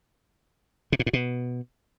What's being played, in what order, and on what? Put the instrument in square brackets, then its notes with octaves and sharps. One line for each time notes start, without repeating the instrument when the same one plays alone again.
[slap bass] C3
A#2
A2
B2